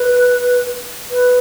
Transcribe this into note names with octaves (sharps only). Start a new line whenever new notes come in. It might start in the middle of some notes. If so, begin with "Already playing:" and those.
Already playing: B4
B4